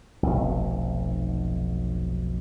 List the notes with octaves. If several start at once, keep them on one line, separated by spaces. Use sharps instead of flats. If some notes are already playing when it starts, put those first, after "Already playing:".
F1 B1